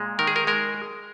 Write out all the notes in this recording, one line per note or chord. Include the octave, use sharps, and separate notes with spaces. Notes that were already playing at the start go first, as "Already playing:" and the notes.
Already playing: A#2 G#3
D#3 A#4
G#4
A#4
G#3 A#4